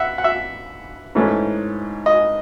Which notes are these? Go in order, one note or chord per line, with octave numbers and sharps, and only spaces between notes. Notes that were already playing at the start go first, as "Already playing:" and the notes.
Already playing: E5 F#5
F#5
E5
G#2 E3 A3 C#4 E4
D#5